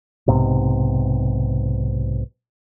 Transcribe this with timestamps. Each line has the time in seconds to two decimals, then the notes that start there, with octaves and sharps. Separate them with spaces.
0.28 B1 G#2 C3